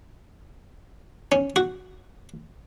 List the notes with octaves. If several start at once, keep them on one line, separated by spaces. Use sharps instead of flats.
C#4
F#4